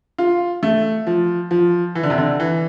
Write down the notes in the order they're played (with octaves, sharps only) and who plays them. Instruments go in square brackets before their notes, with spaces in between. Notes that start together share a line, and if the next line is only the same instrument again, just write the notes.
[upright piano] F4
A3
F3
F3
E3
D3
C3
D3
E3